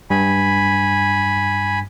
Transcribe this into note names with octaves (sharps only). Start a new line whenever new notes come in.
G2 G#5 B5